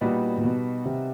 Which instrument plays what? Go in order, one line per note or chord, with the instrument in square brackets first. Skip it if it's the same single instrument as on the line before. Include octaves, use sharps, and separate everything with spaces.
[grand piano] A#2 [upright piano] G3 B3 D#4 F#4
[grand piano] A#2
B2
C3